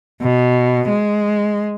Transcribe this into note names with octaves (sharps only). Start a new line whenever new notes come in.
B2
G#3